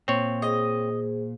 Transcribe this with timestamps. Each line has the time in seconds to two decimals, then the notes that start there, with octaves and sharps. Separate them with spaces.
0.08 A#2 C4 C#5
0.42 G#4 C5 D#5